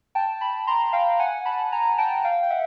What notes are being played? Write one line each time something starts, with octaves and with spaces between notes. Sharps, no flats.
G5 A5
A5 B5
A#5 C6
F5 G5
F#5 G#5
A5 B5
G#5 A#5
G5 A5
F5 G5
G5
E5 F#5